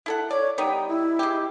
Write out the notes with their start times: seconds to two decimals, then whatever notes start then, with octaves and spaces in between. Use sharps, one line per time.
0.06 E4 A4 F#5
0.31 C#5 D5
0.58 G3 B3 D#4 G5
0.88 E4
1.19 G#3 G4